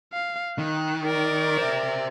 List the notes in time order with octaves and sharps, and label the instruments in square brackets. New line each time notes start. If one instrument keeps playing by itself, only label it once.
[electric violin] F5
[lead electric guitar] D#3 [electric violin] F#6
[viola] A#4 [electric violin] D5
[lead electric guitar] C5 E5